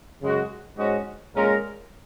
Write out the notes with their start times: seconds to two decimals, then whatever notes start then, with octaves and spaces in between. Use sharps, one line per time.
0.22 F#2 C#3 G#3 F#4
0.78 G#2 G#3 C#4 F#4 D#5
1.35 A#2 G#3 C#4 A#4